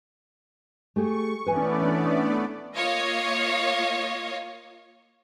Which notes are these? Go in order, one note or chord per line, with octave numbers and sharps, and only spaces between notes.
A3 G4 G#4 C#6
E3 A3 B3 C#4 B4 D5 G#5
D4
A#3 F4 C#5 D#5 F5